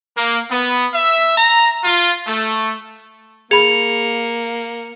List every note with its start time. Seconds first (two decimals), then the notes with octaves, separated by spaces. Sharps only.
0.17 A#3
0.51 B3
0.94 E5
1.38 A#5
1.84 F4
2.27 A3
3.51 A#3 G#4 B5 C#7 F7